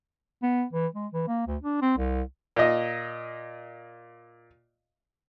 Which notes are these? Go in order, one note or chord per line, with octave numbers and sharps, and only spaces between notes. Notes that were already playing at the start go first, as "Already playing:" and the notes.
B3
E3
G#3
E3
A#3
D2
D4
C4
C2
A#2 D#5